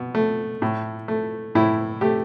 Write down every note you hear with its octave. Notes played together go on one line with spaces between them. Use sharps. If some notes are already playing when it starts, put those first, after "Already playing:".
Already playing: B2
A3
A2
A3
A2 E4
A3 G4